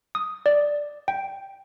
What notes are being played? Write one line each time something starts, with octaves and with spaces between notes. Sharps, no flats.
D#6
D5
G5